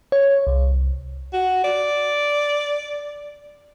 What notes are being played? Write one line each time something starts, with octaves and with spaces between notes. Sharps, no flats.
C#5
C2
F#4
D5